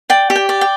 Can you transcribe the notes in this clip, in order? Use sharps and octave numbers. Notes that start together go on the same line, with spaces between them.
D5 G5
G4
G5
D5
G5